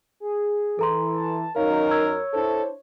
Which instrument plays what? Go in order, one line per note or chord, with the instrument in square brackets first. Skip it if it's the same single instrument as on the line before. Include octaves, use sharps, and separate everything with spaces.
[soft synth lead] G#4
[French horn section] E3 [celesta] A4 A#5 C6
[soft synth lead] A5
[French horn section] F#2 C#4 D#4 [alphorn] A#4 [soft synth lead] C#5 [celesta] F5
[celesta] E6 G#6
[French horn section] D4 E4 C5 [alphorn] A4